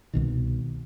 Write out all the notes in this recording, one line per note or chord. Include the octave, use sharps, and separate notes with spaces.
C2 B2 D#3